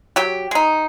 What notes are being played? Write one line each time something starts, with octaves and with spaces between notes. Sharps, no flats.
F#3 G4
G#3 D#4